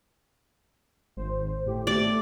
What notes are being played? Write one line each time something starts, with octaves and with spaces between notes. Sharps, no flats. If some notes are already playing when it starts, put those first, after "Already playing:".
G#1 C5
A2 G4
A3 D5